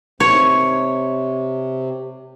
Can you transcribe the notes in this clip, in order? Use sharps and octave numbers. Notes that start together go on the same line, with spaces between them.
C3 C#5